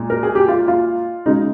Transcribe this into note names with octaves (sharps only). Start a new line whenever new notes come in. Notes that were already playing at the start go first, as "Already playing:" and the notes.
Already playing: A#2 G#3
A#4
G#4
G4
F4
F4
C#3 G#3 D#4